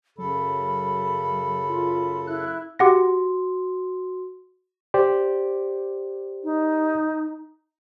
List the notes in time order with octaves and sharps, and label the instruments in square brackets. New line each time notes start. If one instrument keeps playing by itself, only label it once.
[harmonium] F#2 C#3 A4 [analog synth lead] F#3 [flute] B5
[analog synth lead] F4
[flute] E4 [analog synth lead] F#6
[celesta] F#4 C6 [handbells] G4 F#5 A#6
[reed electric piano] G4 C5 D5
[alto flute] D#4